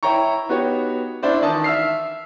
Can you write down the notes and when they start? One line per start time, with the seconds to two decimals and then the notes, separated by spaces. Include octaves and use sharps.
0.03 E4 C#5 G5 A#5 C#6
0.49 B3 D#4 F#4 G4 C#5
1.23 C#4 D4 E4 C5 D5
1.41 D#3 E3 D5 A5 D#6
1.64 E5 E6 F6 C7